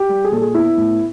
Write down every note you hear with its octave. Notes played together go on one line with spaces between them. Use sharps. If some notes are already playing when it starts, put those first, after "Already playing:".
Already playing: G4
G3
G#4
A#2 A4
G#4
B3 E4
A2